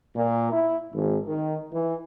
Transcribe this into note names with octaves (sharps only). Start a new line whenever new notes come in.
A#2
E4
G#1
D#3
E3